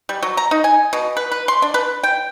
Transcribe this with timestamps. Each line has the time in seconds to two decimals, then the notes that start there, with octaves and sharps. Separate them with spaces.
0.09 G3
0.23 F#3
0.37 A#5
0.51 D#4
0.64 G#5
0.93 B2
1.17 B4
1.32 B4
1.48 C6
1.62 D4
1.74 B4
2.03 G5